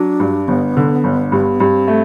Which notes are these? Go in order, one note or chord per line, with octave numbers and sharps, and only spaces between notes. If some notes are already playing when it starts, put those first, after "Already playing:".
Already playing: F#3 D4
G2
G1 B3
D3
G1
G2
G2 C4
A3